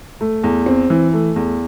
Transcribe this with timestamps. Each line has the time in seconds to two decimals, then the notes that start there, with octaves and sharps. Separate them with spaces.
0.21 A3
0.43 E2
0.66 C4
0.90 E3
1.14 A3
1.36 E2